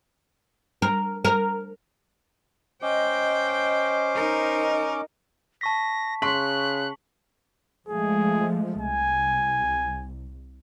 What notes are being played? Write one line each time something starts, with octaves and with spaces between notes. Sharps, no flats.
A#4
A#4
C#4 C5 D#5 G5 D6
D#4 A#4
A5 C#6 A#6 B6
C#3 C6 C#6 F#6 B6 F#7
F3 G#3 A3 G#4
C2 G#5